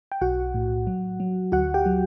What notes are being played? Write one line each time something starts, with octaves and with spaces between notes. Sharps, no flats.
G5
B1 F#4 F#5
A2
F#3
F#3
D2 F#4 F#5
G4 G5
F#3